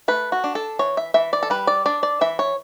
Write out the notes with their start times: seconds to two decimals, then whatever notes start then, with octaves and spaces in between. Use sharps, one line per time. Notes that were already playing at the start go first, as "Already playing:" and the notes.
0.08 A3 B4
0.32 F#4
0.44 D4
0.55 A4
0.79 E3 C#5
0.97 E5
1.14 E3 E5
1.33 D5
1.43 A4
1.50 G3 B4
1.67 D5
1.86 D4 D5
2.03 D5
2.21 E3 E5
2.39 C#5